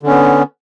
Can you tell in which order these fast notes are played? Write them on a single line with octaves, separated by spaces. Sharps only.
D3 C#4 B3